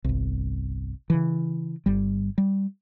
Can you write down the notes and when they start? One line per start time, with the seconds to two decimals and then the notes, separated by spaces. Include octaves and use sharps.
0.04 G1 C2
1.10 C#3 E3
1.86 G1 G3
2.38 G3